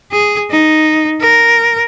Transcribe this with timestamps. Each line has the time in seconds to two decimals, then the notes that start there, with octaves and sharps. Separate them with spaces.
0.12 G#4
0.51 D#4
1.21 A#4